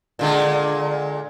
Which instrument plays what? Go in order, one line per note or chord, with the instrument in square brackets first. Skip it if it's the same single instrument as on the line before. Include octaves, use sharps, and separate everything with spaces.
[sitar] A#2 D3 G#3